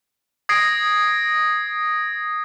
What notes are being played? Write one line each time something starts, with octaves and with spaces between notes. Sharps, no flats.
D#6 G#6 A#6 C7 D7